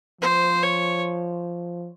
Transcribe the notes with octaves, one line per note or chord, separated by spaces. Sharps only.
F3 C5
C#5